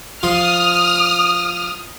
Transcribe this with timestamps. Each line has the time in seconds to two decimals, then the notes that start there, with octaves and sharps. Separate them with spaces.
0.23 F3 F4 D#6 F6